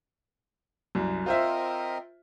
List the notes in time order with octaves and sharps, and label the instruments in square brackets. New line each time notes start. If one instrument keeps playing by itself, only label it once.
[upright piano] C2 F#2
[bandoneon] C4 A#4 D#5 [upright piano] F4 C5 E5